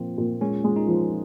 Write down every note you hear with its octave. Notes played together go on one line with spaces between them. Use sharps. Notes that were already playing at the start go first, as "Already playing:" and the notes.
Already playing: A#2 F3 A#3 C4
A#2
G#3 C#4
G#3
D#4
F3